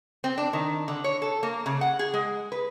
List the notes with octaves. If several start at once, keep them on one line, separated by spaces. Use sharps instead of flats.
C4
D4
D#3
D3
C#5
A4
A#3
C#3
F#5
G#4
G#3
B4